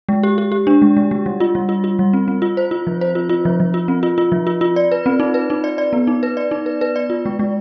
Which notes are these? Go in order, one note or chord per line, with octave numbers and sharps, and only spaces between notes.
G#3
G4
G4
G4
D4
G#3
G#3
G#3
G3
F4
G3
F4
F4
G3
C4
C4
F4
C5
F4
F3
C5
F4
F4
F3
F3
F4
C4
F4
F4
F3
F4
F4
D5
B4
C4
D#4
B4
D#4
D5
D5
B3
D#4
B4
D5
D#4
B4
B4
D5
F4
G#3
G#3